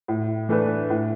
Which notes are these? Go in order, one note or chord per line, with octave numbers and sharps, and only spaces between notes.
A2
E3 A3 D4 B4
A2